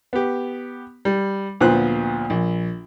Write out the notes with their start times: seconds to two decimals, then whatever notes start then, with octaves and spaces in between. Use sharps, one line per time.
0.13 B3 G4
1.05 G3
1.60 D2 A#2 F3 B3 C5 F#6
2.30 A#1